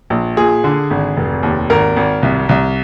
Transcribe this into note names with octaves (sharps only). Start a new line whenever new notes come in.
A#1
A#2 G#4
D3
G#1
F1
D#2
G#1 A#4
G#1
C2
C2